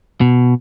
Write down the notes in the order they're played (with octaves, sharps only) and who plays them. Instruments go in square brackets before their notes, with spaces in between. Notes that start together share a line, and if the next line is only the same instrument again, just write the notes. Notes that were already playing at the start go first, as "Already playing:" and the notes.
[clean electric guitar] B2